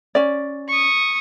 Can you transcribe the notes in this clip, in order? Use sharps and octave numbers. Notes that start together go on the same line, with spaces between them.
C#4 D5
C#6 D#6